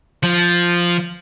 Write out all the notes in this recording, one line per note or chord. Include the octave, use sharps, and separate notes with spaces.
F3